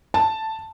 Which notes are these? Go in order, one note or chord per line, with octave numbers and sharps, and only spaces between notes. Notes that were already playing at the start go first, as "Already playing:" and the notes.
A5